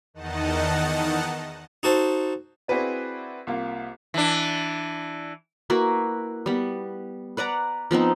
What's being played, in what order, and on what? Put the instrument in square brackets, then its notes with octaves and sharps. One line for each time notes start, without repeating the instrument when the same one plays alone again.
[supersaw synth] E2 D#3 D#4 D#5 F#5 A5
[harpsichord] D#4 F#4 A4 C5
[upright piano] C4 E4 F#4 G#4 B4 D5
C2 A#3 F4
[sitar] E3 D4
[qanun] A#3 E4 F#4 B4
G3 B3
B4 D5 F#5 A#5
F3 B3 C4 D#4